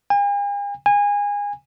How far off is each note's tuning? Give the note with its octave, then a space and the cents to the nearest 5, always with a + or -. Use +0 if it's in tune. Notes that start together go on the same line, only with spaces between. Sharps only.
G#5 -45
G#5 -25